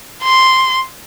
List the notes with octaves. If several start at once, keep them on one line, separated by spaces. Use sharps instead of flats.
C6